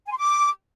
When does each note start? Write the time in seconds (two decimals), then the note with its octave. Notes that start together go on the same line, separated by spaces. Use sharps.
0.07 G#5
0.12 C6
0.18 D6